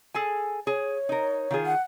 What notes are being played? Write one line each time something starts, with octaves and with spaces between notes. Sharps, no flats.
G#4 A4 G#5
G#4 C#5
D#4 A#4
D#3 F4 G#4
F#5